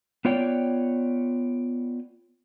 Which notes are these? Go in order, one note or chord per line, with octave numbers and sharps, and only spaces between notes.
B3 F4 C#5 D5 G5